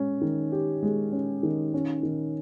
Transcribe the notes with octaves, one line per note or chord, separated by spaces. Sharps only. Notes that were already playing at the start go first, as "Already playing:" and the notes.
Already playing: G#3 C#4
D#3
G4
G#3
C#4
D#3
C#4
D#3